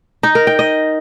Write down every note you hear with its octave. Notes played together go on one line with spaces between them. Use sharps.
D#4
A#4
G5
D#5